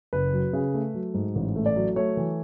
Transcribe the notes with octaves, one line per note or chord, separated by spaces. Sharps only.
F#1 B4
F#3
C#3
A3
F#3
G#2
A1
A3
D5
F#3
A3 C#5
E3